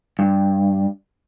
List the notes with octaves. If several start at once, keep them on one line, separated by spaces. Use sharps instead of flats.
G2